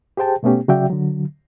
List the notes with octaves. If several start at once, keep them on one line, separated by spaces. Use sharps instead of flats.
G4 G#4 C5 G5 A5
B2 A3 B3 C#4 G4
C#3 F#3 F#4 D5 E5 G5
D3 F#3